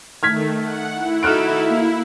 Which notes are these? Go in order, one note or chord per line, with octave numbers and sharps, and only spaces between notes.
D#3 A3 F6 G#6 B6
F#5
E4
D#4 F#4 A4 F6 F#6 D7
A#3